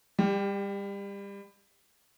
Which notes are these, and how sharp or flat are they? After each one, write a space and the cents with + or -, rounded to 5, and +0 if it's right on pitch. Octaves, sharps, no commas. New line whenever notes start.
G3 +30 G4 +0